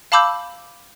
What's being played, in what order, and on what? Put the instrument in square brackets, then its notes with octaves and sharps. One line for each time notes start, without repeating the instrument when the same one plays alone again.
[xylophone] F5 A5 B5 D6 E6 G6